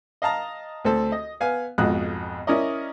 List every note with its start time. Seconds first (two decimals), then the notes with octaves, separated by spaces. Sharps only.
0.22 D#5 F5 A5 A#5
0.85 D2 C4 A4
1.12 D#5
1.40 B3 F5 G#5
1.78 B1 F2 G#2 F#4 D#6 F#6
2.47 C#4 E4 A#4 D5 D#5